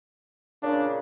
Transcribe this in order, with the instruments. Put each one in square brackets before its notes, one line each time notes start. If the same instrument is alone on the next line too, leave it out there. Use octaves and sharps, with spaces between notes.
[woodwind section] A#2 C#3 [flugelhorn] D4